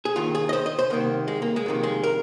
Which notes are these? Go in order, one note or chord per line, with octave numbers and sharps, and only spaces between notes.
G#4
D#2 D#3 F4
G#4
D#5
C5
D#5
C5
C2 C3 D#3 A#3
G#3
A#3
G#3
F2 C3 D#3 A#3
G#3
A#4